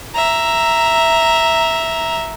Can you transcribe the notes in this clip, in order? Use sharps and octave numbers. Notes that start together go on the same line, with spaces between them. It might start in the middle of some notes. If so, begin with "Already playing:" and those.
E5 A#5